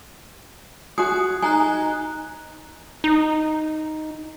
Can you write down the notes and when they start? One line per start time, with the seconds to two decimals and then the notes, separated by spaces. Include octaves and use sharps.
0.98 F#4 G#4 D#6
1.42 D#4 G#4 G#5 A#5 F#6
3.04 D#4